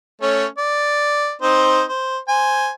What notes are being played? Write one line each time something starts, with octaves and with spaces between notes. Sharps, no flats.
A3 C#4 C#5
D5
C4 D#4 C5
C5
C5 G#5